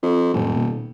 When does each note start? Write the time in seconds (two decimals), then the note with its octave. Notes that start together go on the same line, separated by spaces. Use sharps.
0.03 F2
0.34 D#1 F2 A2 F#3
0.56 B2 A#3